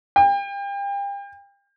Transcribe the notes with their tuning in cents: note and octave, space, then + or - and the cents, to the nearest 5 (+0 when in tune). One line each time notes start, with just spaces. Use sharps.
G5 +35